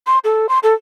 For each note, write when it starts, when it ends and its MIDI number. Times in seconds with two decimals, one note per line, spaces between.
0.07 0.18 84
0.24 0.47 69
0.49 0.59 84
0.63 0.74 69